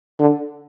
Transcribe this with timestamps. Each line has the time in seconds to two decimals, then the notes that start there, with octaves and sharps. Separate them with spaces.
0.19 D3